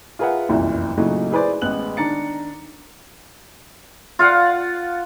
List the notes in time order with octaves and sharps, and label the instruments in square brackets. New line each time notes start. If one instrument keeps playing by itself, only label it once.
[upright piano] F4 G#4 A#4 B4 E5 F#5
F1 C2 F#2 A#2 E3
A#2 C#3 F#3 A3 D#4 E4
E4 G#4 B4 C5 D5
A1 G#3 B3 F#6 F#7
D#3 D4 A#5 A6 C#7
[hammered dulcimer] F4 F5 F#5